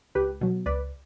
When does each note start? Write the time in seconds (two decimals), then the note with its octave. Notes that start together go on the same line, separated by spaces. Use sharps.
0.15 C#2 G4 B4
0.41 B2 F#3
0.66 C#2 B4 D5